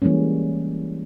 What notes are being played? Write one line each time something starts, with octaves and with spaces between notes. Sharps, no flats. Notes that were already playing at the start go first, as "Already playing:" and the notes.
E3 G3 G#3 A#3 C#4